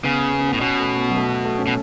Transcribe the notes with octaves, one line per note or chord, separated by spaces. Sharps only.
C#3 B3
B3
C#4
B3
A2
B2 C#4
A3
B3
F#3
A3
A3
C#4
B2